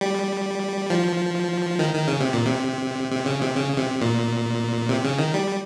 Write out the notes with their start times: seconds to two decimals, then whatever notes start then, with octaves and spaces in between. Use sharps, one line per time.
0.01 G3
0.90 F3
1.79 D#3
1.94 D#3
2.08 C#3
2.20 C3
2.33 A#2
2.46 C3
3.11 C3
3.26 C#3
3.42 C3
3.56 C#3
3.78 C3
4.01 A#2
4.89 C3
5.04 C#3
5.18 D#3
5.34 G3